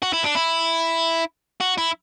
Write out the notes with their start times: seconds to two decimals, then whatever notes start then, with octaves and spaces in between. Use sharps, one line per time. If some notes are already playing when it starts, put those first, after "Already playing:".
0.02 F#4
0.13 E4
0.24 D4
0.35 E4
1.61 F#4
1.78 E4